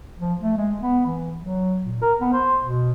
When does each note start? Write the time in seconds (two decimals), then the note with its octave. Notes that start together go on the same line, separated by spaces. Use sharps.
0.20 F3
0.41 A3
0.57 G#3
0.82 B3
1.06 E3
1.40 F#3
1.84 A#2
2.02 A#4
2.21 B3
2.33 C5
2.62 B2